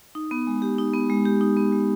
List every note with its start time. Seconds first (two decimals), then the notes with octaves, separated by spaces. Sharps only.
0.15 D#4
0.31 B3
0.47 G#3
0.62 G4
0.78 D#4
0.93 B3
1.10 G#3
1.25 G4
1.41 D#4
1.57 B3
1.72 G#3